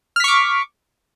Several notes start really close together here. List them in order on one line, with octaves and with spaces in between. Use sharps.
F6 B6 C#6 D6